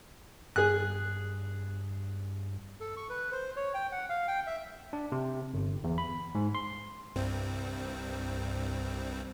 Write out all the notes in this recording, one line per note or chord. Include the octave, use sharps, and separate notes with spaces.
G2 G#4 F#6
A4
C#6
B4
C5
C#5
G5
F#5
F5
G5
E5
D4
C3
G1
E2
B5
G#2
C6
C2 G2 C4